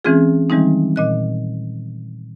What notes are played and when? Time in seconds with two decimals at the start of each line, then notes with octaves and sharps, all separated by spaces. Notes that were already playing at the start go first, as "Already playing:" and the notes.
0.04 E3 G#3 C4 C#4 F4 G#4
0.50 D#3 E3 G3 G#3 C4 D#4
0.96 A#2 D#5 F#6